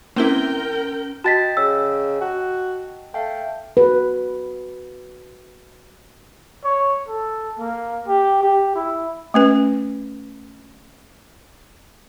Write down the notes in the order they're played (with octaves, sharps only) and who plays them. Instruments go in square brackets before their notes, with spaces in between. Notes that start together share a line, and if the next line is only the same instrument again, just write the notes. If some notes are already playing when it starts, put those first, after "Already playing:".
[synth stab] A#3 C4 E4 [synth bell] C#4 G7 [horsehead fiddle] A#4 G5
[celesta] F#4 A6 B6 [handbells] D#5 G5 A5
[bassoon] C#3 [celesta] E6
[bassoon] F#4
[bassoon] A3 [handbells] F5 G5
[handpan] F#4 B4
[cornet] C#5
A4
A#3
G4
G4
E4
[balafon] A3 C#4 B4